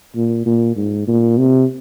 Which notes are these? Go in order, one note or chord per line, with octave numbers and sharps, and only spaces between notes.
A#2
A#2
G#2
A#2
C3